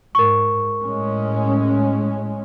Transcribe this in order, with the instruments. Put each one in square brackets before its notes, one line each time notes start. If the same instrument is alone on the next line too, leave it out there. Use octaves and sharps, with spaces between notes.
[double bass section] G#2 [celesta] A#4 C#6
[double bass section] A2 G#3 C#4